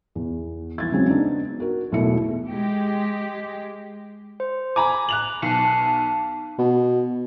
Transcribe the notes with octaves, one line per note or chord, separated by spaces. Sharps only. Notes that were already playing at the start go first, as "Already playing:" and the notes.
E2
E3 G#6 A6
C#3 F#3 G#3 C4 C#4
B3 D4 D#4
F#4 A#4
E1 B1 B2 A3 E4 C#7
G#3 G4
C5
G#5 A#5 B5 D6
F#6 F7 F#7
B1 A5 C7 C#7
B2